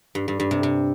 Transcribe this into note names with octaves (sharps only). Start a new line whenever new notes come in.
G2
G2
G2
C3
C3